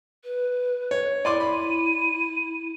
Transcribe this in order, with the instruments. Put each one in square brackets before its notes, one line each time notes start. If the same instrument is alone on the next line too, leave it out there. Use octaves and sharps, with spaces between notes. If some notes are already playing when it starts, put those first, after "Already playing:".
[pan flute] B4
[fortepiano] C#5
[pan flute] E4 [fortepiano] D5 C6 D6 [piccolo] D#7
[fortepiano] B5